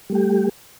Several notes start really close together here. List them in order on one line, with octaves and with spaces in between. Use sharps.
G3 A3 G4